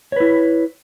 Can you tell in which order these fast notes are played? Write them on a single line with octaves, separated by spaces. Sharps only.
C#5 B4 E4